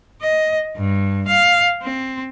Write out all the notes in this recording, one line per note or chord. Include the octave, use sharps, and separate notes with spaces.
D#5
G2
F5
C4